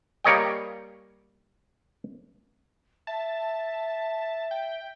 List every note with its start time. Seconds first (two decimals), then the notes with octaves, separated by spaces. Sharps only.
0.24 G3 A#3 C#5 D#5 G5
3.07 E5 A5
4.51 G5